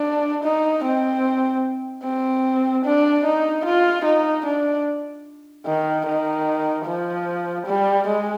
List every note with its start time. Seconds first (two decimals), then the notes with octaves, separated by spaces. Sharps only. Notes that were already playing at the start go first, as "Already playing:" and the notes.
Already playing: D4
0.44 D#4
0.84 C4
2.04 C4
2.84 D4
3.25 D#4
3.65 F4
4.05 D#4
4.45 D4
5.66 D#3
6.06 D#3
6.86 F3
7.66 G3
8.07 G#3